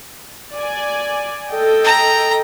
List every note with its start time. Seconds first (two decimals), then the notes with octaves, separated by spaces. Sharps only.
0.53 D5 G#5
1.51 A4 D#5 G5
1.84 A#5